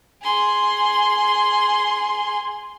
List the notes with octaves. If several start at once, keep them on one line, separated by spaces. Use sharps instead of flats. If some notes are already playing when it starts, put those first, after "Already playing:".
G#4 C6